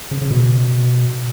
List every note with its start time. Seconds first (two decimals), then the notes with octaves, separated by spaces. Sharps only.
0.11 C#3
0.22 C#3
0.31 B2